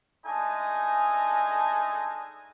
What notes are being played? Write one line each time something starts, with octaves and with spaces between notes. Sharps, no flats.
G#3 A3 D4 D#4 A4 G#5